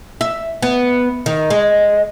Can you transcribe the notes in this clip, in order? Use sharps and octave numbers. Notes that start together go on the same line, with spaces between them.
E5
B3
D#3
G#3